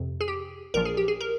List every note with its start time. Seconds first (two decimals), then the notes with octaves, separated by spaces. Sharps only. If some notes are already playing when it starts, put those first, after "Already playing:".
Already playing: F2 C3
0.21 G#4
0.28 G4
0.74 A#1 A#2 F3 A#4
0.85 G#4
0.97 G4
1.08 G#4
1.21 A#4